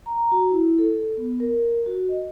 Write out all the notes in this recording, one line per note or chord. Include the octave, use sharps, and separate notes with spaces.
A#5
F#4
E4
A4
B3
A#4
F#4
D#5